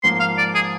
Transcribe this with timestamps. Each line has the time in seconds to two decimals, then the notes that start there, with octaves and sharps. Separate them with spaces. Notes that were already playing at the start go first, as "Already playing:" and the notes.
0.03 G#2 F3 A#3 C6
0.20 F5
0.38 D5
0.55 G#4